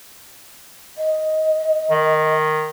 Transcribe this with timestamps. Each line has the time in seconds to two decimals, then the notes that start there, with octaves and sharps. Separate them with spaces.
0.98 D#5
1.91 D#3